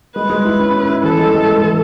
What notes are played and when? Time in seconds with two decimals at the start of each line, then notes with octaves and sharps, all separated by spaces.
0.15 G#3 B4
0.30 G#3
0.45 E4
0.60 C#4
0.73 C#4
0.89 E4
1.03 E3 A4
1.18 G#3
1.33 G#3
1.48 G#3
1.63 E3